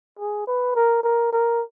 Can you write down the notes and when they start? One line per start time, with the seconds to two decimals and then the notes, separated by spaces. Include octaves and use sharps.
0.19 G#4
0.47 B4
0.76 A#4
1.04 A#4
1.33 A#4